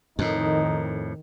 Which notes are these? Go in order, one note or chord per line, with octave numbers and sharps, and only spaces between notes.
F2 A2 D#3 D#4